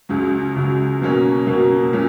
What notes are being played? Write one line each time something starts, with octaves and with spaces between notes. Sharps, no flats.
C#2 C#3 F#3
C#2 C#3 F#3
B2 F#3 A#3 C#4
B2 F#3 A#3 C#4
A#2 F#3 C#4